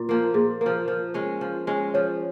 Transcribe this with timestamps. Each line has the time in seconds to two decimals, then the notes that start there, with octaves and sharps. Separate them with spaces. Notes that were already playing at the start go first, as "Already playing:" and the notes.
Already playing: A#2
0.09 F3 A#3
0.34 A#2 G#4
0.61 F3 A#3 A#4
0.88 F3
1.14 G#3 C#4
1.41 F3
1.67 G#3 C#4
1.94 F3 C#5